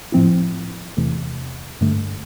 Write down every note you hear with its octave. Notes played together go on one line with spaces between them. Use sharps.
A2 F3 C4 E4
E2 C3 E3 A3
G2 D3 A3